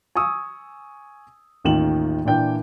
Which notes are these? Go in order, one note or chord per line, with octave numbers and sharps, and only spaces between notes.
G#5 C#6 D#6 E6
A1 D#2 D#3 F4 E7 F#7
A#2 E3 D4 G5 G6